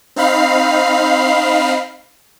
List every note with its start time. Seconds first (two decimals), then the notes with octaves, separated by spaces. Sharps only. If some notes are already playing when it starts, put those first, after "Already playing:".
0.16 C4 D#4 F5 B5 C7